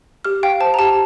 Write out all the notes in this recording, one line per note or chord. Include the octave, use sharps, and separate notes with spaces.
G4 F6
F5 G5
C5 A5
A#5
G4 A5